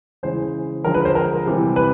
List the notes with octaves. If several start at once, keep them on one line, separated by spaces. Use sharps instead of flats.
C#3 E3 G#3 C5
D3 F3 G#3 A#4
B4
C5
A#4
C3 E3 G3
B4